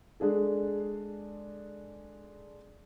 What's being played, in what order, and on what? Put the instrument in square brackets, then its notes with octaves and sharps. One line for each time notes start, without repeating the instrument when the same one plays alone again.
[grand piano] G#3 D4 G#4 A4